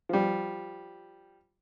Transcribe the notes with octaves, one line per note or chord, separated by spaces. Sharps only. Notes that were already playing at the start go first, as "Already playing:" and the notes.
F3 G3